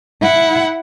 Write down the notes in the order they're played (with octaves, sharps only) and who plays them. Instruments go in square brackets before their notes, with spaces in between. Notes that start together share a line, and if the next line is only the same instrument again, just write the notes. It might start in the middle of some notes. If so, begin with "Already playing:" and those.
[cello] E4 F#5